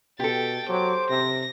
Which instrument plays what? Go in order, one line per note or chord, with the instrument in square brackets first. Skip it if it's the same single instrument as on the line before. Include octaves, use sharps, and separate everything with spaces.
[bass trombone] B2 [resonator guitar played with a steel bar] G4 A4 [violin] G5 A6
[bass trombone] F#3 [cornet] C5 [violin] D6
[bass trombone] C3 [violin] A#6